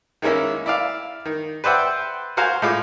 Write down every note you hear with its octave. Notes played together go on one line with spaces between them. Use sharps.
D#3 G#3 A#3 C#4 E4
E4 D5 F5
D#3
B4 C5 D5 E5 F#5 G5
F#4 A#4 C5 F5 G#5
A2 G#3 F4 D6